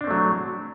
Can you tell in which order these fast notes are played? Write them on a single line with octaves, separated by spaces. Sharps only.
D4 C4 A3 F#3